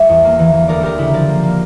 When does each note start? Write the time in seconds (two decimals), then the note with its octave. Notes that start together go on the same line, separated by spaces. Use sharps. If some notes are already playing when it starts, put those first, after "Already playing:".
Already playing: G3 C#5 E5
0.09 E2
0.24 A#3
0.39 E3
0.53 E3
0.68 D2 A#4 D5
0.81 D2 G4 A#4
0.98 C#3 E4 G4
1.14 F3 A#4 D5
1.29 A#3
1.43 A#3